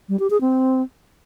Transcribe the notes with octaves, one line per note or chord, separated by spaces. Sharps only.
G3
G4
G#4
C4